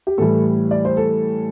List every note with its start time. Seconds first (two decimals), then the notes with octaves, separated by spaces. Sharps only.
0.07 G4
0.18 A2 E3 G3 A4
0.71 D5
0.85 C5
0.97 A4